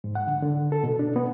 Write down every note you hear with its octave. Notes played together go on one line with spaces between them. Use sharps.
G#2
F#5
D3
D3
A4
B2
D4
B3